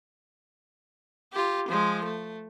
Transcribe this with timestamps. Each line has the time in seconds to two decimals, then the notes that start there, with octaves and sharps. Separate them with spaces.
1.32 F4 G4
1.68 F3 G#3
2.04 A3